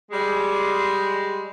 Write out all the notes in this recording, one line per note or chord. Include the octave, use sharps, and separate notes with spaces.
G3 G#3